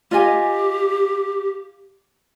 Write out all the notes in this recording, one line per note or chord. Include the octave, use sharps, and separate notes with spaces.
F4 G4 D#5 G#5